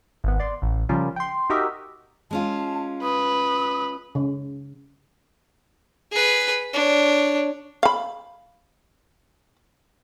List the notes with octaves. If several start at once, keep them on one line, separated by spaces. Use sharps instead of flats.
G#1 B3
D5 C6
A1
C#3 F3 G3 C#4 F4 A#4
G5 C6
D#4 F#4 G4 A#4 D#5 E5
G#3 C#4 F4 A5
B4 D#6
C#3
G#4 B4
D4 C#5
F5 B5